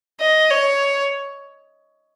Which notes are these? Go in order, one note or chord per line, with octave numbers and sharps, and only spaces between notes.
D#5
C#5